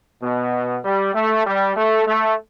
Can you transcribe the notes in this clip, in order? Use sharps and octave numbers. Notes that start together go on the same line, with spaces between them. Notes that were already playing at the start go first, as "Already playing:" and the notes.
B2
G3
A3
G3
A3
A3